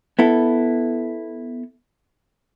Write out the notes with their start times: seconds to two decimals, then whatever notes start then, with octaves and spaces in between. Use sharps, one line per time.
0.19 B3 E4 A4